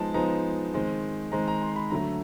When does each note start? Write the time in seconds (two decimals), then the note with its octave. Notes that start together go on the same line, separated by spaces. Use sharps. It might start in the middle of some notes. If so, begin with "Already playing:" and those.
Already playing: F3 G#3 B3 D#4 A5
0.14 F3 G#3 B3 D#4 A#5
0.74 D#3 G#3 C4
1.32 D#3 G#3 C4 A#5
1.48 A#5
1.62 C6
1.76 B5
1.91 D3 F#3 A3 A#5